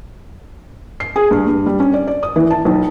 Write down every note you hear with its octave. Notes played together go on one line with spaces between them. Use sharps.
C7
G#4
G2
G2
G3
C#4
D5
D5
D#6
E3
A5
B1